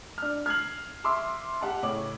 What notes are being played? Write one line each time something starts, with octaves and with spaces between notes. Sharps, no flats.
D4 F6
F6 G#6 C7 F#7
E5 C6 D6 E6
G4 F#5 A5
A2 C#3 C#4 D6 F#7